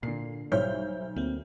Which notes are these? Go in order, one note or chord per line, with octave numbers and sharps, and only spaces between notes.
A#2 D3 C7
B1 G3 C5 C#5 E5 F6 G6
D2 A#3 C4